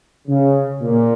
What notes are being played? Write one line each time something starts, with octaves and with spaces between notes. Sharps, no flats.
C#3
A#2